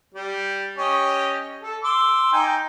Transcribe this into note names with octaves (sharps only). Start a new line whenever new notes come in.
G3
C#4 G4 D#5
A4
C6 D6 E6
D#4 G5 G#5